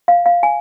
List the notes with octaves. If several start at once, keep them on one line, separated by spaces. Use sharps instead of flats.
F5
F5
G#5